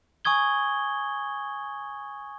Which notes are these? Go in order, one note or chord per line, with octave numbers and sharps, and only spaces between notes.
G#5 C#6 D#6 G#6 G7